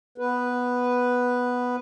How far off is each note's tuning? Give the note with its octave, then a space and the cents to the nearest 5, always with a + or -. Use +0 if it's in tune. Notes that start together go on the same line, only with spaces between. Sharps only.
B3 +0 B4 +0